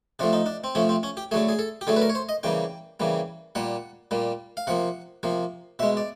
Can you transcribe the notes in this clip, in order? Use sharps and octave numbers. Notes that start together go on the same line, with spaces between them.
C3 F3 A3 D4
D#4
D4
C4
C3 F3 A3 C#4
C4
C#4
G4
D3 F#3 A3 G#4
G#4
A4
G4
D3 F#3 A3 G#4
B4
A#4
C#5
C5
D#5
C#3 E3 G3 A#3 G5
C#3 E3 G3 A#3
A#2 G3 A#3 F#5
A#2 G3 A#3
F5
C3 F3 A#3 F#5
C3 F3 A#3
B2 G#3 E5
D5